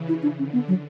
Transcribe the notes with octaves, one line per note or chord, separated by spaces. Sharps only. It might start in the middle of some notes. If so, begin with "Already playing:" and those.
Already playing: C#3 E3
E4
D4
D3 C#4
B3
F#3